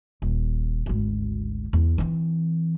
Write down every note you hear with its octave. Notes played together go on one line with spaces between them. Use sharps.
D#1
G#1 D2
E2
E3 C4